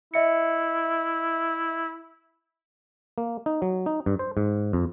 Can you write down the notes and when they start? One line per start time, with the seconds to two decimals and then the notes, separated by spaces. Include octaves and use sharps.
0.14 E4 D#5 E5 C#7
3.18 A#3
3.46 D#4
3.62 F#3
3.86 D#4
4.06 G2
4.19 C5
4.37 G#2
4.73 F2